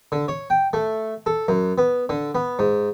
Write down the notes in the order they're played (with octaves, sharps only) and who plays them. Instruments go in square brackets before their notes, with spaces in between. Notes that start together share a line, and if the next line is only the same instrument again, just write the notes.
[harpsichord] D3
C#5
G5
A3
A4
F#2
B3
D3
B3
G#2